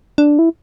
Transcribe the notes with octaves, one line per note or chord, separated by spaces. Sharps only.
D4
E4